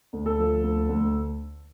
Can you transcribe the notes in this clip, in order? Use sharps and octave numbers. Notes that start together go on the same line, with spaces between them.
D2
A4
F3
D2
D2